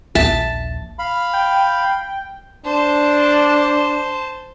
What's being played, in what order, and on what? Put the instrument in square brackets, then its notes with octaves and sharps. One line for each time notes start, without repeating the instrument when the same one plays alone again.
[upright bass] A#1 D#2 [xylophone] E5 [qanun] A5
[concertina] F5 B5
[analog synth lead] G5
[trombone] D4 [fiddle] C5 A5